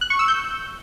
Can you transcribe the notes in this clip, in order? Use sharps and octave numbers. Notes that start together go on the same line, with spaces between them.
F#6
C#6
E6
G6